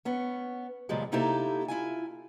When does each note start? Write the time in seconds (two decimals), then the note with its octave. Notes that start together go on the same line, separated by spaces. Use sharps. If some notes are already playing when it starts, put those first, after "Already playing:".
0.05 B3 C#4
0.89 F#2 A#2 C#3 F3 G3 G#3
1.12 C3 A#3 D#4 E4 G4 A4
1.68 E4 F4 G#5